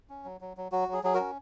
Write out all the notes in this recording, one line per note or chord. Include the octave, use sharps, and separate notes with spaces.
C#4
F#3
F#3
F#3
F#3 F#4
F#3 G#4
F#3 G#4
F#4 A#4
C#4